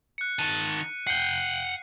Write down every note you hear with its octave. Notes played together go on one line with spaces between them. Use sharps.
F#6 C#7
D#3 A5 D#7
F#5 G5 C7